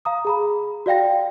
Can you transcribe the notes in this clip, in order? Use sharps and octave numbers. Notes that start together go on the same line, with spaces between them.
F5 A#5 D#6
G#4 A#5 B5
F#4 D5 F5 G5 A#6